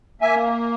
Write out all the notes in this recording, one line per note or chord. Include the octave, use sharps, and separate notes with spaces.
A#3 E5 G#5